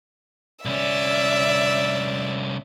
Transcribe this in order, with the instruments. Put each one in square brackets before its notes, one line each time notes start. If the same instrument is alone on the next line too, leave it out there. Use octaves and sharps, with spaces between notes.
[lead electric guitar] C2 C#4 [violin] D5 E5